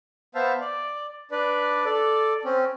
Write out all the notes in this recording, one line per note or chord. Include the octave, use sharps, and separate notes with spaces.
B3 C5 E5 F5 A5
D5
D4 B4 D5
A4 D5
C4 C#4